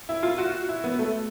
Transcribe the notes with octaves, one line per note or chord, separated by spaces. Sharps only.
E4
F4
F#4
E4
B3
A3